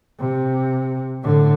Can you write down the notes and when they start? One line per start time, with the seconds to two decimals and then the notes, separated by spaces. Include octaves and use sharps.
0.19 C3
1.23 A2 D3